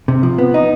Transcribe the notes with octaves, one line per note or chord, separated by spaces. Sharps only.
C3
F3
B3
D#4